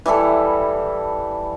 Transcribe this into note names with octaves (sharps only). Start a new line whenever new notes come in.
E3 G3 E4 A4